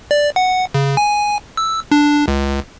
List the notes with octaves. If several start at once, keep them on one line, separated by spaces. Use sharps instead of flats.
D5
F#5
C#3
G#5
E6
D4
C#2